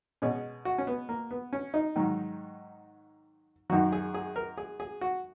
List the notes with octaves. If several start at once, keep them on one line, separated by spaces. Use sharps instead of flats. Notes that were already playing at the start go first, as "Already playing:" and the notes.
B2 G#3 C#4
F#4
C#4
B3
A#3
B3
C#4
D#4
G#2 D#3 F#3
F#2 D#3 F#3 F#4
G#4
G#4
A#4
G#4
G#4
F#4